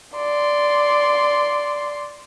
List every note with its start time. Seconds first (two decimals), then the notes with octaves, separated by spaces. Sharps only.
0.16 D5 C6